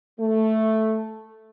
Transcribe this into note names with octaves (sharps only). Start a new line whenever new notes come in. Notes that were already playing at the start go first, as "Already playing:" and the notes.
A3